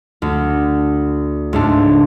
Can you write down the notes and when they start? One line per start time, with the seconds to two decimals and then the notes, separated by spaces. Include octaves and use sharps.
0.22 D2
1.53 C#2 G#2 A3 D4